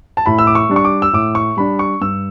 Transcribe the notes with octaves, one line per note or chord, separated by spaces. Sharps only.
A5
A2 B5
E6
D6
C#6
G3 D4
C#6
D6
E6
A2 D6
C#6
G3 D4 B5
C#6
G2 E6